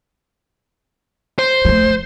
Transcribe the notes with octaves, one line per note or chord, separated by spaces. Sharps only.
C5
F3 A3